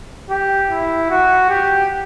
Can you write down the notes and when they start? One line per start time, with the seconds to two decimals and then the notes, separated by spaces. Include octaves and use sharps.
0.30 G4
0.70 E4
1.10 F#4
1.50 G4